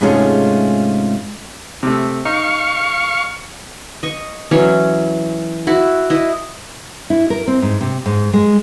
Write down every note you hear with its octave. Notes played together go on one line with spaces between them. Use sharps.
G#2 C3 G#3 A3 C#4 F4
C3 A3
D#4 F5 C#6
D#5 C#6
E3 F#3 C#4
E4 F#4
E4 D#5
E4
A#4
C4
G#2
C3
G#2
G#3